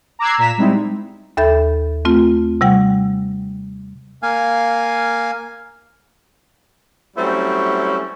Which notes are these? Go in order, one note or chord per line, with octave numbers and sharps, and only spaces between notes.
A#5 D6 E6 F#6 G#6 C7
A#2 A#5 B6 E7
G3 G#3 C4 D#4 E4
D#2 A4 E5 B5 G6 A6
A3 C4 F4
C3 G3 F#5 G5
A#3 F5 G#5
F#3 G3 A3 C4 C#4 E4